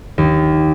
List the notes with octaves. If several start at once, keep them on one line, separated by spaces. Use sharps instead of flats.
D#2